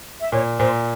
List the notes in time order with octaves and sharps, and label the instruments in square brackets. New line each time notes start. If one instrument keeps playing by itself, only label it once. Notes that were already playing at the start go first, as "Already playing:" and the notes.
[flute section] E5
[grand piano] A#2 [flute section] C#5
[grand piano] A#2 [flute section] C5